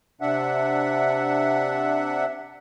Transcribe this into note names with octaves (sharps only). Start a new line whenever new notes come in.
C3 D4 E5 F#5